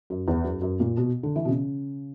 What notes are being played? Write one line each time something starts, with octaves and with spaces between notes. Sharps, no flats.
F#2
E2
F#2
F#2
A#2
B2
D3
E3
B2
C#3